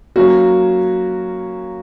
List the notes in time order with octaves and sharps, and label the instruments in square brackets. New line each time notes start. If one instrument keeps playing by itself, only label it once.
[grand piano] F#3 A#3 C#4 F#4